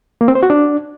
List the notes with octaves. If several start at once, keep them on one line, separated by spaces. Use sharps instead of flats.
A#3
C4
C5
F#4
D4